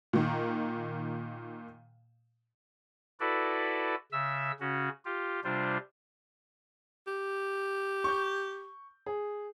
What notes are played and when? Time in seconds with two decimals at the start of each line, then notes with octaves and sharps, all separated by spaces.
0.13 A#2 D#3
3.20 E4 F#4 A4 B4 D5
4.12 C#3 E5 E6
4.60 C#3 C#4 F#4
5.05 F4 G4
5.44 C3 G3 D4 F4 C5
7.07 G4
8.04 C#6 G6
9.06 G#4